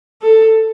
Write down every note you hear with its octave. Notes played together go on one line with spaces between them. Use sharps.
A4